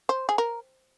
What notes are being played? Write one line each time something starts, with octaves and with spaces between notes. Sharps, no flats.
C5
G#4
A#4